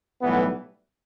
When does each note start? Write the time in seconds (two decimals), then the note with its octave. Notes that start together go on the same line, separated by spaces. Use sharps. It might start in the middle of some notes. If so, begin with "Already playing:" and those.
0.22 B1 A2 E3 G3 B3